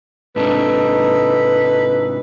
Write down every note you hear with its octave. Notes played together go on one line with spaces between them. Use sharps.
G#2 C3 D4 D#4 A4 B4